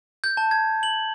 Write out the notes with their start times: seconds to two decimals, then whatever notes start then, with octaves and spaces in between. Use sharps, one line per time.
0.24 G6
0.37 A5
0.51 G#6
0.83 F#7